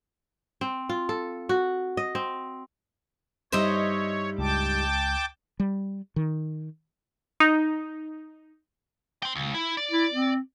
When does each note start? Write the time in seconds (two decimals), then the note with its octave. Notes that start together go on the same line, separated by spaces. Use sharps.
0.61 C4
0.89 F4
1.09 A4
1.49 F#4
1.97 D#5
2.15 C4
3.52 G2 G3 D#4 C5 C#5 D#5 E5
4.38 C#2 G5 A5 D6
5.60 G3
6.16 D#3
7.40 D#4
9.23 G5 C6
9.35 C#2
9.54 E4
9.77 D5
9.91 E4
10.13 C4